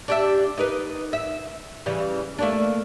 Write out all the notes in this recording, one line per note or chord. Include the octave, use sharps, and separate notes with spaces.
D4 G4 E5
D#4 A#4 B4
E5
C#3 E3 G3
A3 A#3 D4